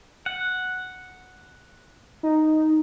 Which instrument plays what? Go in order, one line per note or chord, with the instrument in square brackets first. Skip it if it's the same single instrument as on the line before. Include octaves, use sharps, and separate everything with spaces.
[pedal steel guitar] F#5
[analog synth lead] D#4